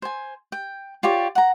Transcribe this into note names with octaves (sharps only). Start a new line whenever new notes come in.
C5 G#5
G5
F4 G4 C#5 D5
F#5 A#5